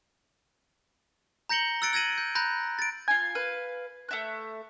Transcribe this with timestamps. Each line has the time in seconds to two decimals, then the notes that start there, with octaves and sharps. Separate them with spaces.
1.49 A#5 G6 A#6 C#7 F#7 G7
1.82 E6 F#6 A6 C#7 D7
1.93 E6 G#6 A#6 D#7 F#7
2.18 G6
2.35 A#5 B5 F#6 G6 A#6
2.79 A6 D7
3.08 F4 G#5 G#6
3.35 B4 F5
4.09 A3 E5 F#6